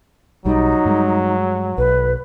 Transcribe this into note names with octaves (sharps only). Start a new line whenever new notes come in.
B1 F#3 G3 D#4
G2 G3 G#3
B1 B4